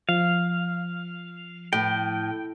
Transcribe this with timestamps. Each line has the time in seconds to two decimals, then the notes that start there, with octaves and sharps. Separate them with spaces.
0.09 F3 F5
1.73 A2 G5